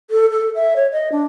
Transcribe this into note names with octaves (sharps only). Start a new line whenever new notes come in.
A4
A4
E5
C#5
D#5
D4